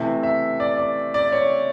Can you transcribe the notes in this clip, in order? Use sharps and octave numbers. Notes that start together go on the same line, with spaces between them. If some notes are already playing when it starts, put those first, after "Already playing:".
Already playing: C3 E3 A3 E5
E5
D5
D5
D5
C#5